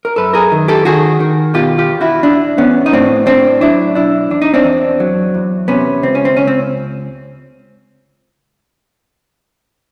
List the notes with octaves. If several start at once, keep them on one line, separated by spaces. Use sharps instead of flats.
A#4
F#2 A4 B4
G#4 A#4
D#3
G4 A4
D#3 F#4 G#4
D#3
B2 F4 G4
F4 G4
E2
E4 F#4
E2 D4 E4
E2 B3 C#4
D#4
A2 C4 D4
A2 C4 D4
F#3 D4 E4
B1 D4 E4
E2 D4
D#4
C4 D4
E2
F#3
E2
C3 B3 C#4
C#2 C4
C#4
C4
C#2 C#4
C4